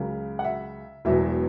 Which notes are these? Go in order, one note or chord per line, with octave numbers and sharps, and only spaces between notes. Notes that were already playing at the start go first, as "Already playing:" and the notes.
Already playing: C#2 C#3 F#3 A#4
F#5
E5
E1 E2 B2 F#3 E5